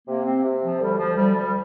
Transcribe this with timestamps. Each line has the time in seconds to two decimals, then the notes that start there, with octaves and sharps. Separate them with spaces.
0.08 C3 A#3
0.25 C4
0.44 C3
0.62 F3
0.80 D2 G3
0.98 F3
1.16 D2 G3
1.35 G3